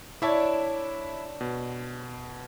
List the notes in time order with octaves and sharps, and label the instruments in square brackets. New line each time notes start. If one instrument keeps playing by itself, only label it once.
[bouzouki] D4 C#5 [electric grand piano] E4 E5 A5
[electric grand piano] B2